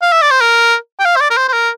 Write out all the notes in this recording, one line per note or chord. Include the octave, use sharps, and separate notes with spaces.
F5
E5
D5
C5
A#4
G5
F5
C5
D5
A#4
C5
C5
A#4